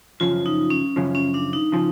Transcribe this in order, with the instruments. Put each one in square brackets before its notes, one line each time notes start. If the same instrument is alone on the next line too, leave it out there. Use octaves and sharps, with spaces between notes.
[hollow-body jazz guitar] F#2 C#3 F3 [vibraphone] F4
[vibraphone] D#4
C#4
[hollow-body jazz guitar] F#2 C#3 F3
[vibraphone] C#4
D4
D#4
[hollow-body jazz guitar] C#3 F3